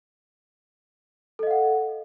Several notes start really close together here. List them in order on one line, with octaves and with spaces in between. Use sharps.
A4 D#5 F5 F#5